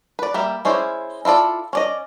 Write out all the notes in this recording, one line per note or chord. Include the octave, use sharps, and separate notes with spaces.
B4 D5
G3 A#3 E5
G#3 C#4 E4 C5 D5
E4 F4 A4 D5
C#4 D5 D#5